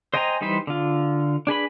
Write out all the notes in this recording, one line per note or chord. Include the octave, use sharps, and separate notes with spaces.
C5 D#5 G5 G#5 A#5
E3 G3 D#4 B4 C5
D3 F4
D4 G#4 B4 B5